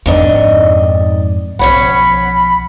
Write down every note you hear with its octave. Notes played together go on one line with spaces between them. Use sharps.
F2 G#2 D#3 D4 D#5
B1 F3 C#4 C#5 F#5 B5